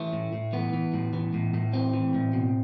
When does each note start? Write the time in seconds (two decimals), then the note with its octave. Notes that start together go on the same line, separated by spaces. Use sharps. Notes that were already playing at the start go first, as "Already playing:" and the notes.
Already playing: E3 A3
0.13 A2
0.33 A2
0.53 E3 B3
0.73 E3
0.94 A2
1.13 E3
1.34 A2
1.54 A2
1.73 E3 C4
1.94 E3
2.14 A2
2.33 B2